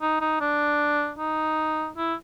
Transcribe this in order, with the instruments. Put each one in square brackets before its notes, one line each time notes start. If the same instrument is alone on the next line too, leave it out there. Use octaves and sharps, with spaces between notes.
[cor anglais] D#4
D#4
D4
D#4
E4